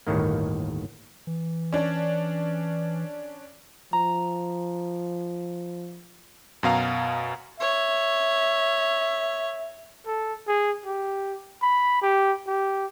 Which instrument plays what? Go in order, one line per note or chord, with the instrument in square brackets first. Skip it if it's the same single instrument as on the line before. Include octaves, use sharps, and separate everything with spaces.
[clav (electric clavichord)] G1 D#2 A2 D#3 A#3
[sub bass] E3
[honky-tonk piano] C#4 D4
[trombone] F3 [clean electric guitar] A#5
[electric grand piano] F#2 B2 F5 A#5
[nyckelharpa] C#5 [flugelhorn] E5
[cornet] A4
G#4
G4
B5
G4
G4